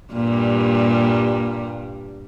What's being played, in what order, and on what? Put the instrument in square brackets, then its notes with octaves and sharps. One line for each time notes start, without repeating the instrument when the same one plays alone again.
[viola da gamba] G2 A#2 G3